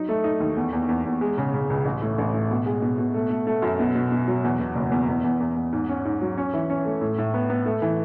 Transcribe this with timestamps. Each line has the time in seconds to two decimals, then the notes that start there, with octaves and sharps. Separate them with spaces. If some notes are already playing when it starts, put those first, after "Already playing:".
Already playing: F#3 D#4
0.09 A3
0.24 D#4
0.40 D#2
0.57 E2
0.73 E2
0.89 E2
1.05 E2
1.21 G#3
1.38 C#3
1.54 C#3
1.70 C#2
1.85 A1
2.02 A2
2.18 A1
2.34 A2
2.51 B2
2.66 G#3
2.82 B2
2.98 B2
3.14 A3
3.30 A3
3.47 A3
3.62 F#2
3.79 B2
3.95 B2
4.12 B2
4.28 F#3
4.44 E2
4.59 B2
4.75 F#1
4.92 E2
5.08 E2
5.24 E2
5.40 E2
5.56 E2
5.72 G#2
5.89 C#4
6.05 G#2
6.21 F#3
6.38 C#4
6.53 E3
6.70 C#4
6.85 A3
7.01 A2
7.18 A2
7.34 B3
7.50 B3
7.66 A3
7.82 E3